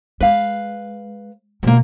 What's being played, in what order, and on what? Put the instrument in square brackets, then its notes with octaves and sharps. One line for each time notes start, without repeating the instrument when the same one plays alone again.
[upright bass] G#3 [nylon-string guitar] B4 F5
[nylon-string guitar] D2 A#3 [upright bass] B2 C#4